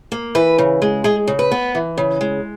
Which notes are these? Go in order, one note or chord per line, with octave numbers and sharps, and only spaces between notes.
A#3
E3 B4
C#3
G#3
G#3 G#4
C#3
B4
B3
E3
C#3
G#3